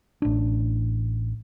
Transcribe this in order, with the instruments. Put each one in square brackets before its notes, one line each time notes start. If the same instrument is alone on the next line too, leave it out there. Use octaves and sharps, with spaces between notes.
[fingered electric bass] A1 D4